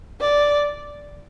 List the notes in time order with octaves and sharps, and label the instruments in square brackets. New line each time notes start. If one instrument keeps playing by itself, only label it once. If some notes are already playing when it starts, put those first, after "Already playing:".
[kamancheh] D5